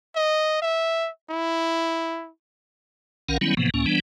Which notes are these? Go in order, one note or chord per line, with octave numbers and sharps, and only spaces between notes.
D#5
E5
E4
B1 D#3 C#4 A#4 F5 F#5
D#3 F#3 G3 B3 C#4 E4
A2 C3 E3 F3 A#3 B3
C#2 A2 A#3 C#4
E3 G3 B3 D4